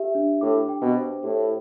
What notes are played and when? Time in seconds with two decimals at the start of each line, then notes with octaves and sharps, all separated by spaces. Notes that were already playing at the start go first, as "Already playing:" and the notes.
Already playing: G4 E5
0.15 D4
0.41 A2 D6
0.69 G5
0.82 B2
0.96 C5
1.24 A2 G4